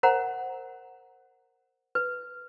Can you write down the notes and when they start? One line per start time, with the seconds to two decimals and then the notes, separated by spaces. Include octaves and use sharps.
0.03 A#4 C5 F#5 A#5
1.95 B4